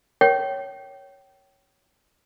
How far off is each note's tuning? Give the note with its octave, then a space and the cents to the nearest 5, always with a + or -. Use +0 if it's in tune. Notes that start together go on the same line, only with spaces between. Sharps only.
C#5 +0 G5 -25